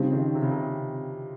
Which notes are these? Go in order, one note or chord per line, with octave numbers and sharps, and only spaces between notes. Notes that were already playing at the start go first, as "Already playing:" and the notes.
Already playing: C#3 F3 G3 C4 D#4
D#3
C3
C#3
C3